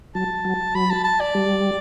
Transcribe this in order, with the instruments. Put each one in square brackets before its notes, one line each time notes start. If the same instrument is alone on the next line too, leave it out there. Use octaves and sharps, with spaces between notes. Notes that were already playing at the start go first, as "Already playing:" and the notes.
[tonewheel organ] F#3 [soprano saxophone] A5
[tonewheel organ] F#3
[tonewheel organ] F#3 [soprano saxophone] B5
[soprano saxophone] A5
A5
D5
[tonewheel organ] G3